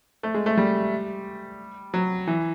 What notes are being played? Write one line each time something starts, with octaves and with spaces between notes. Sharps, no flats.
A3
G#3
A3
G3
F#3
E3